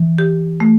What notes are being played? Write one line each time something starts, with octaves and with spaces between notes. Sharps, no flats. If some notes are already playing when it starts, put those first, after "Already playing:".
Already playing: E3
G4
A3